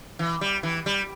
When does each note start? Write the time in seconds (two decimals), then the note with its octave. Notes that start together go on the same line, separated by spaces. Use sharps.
0.19 E3
0.41 G3
0.63 E3
0.86 G3